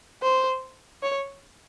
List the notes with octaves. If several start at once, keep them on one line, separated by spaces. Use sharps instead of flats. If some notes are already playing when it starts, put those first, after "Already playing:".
C5
C#5